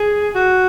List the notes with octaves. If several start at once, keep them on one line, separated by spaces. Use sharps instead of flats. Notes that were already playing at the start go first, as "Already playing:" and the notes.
Already playing: G#4
F#4